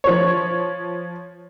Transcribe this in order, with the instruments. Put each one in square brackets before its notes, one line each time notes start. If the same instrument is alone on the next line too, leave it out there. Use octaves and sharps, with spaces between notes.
[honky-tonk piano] F3 C#5